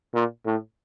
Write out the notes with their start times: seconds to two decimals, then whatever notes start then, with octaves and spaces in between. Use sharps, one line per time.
0.14 A#2
0.46 A2